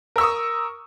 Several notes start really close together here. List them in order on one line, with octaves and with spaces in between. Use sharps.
A#4 E6 C#6 D#6